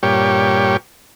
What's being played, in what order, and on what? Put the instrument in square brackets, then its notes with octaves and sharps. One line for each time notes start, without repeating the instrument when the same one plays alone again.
[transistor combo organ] G2 A#2 G4 C#5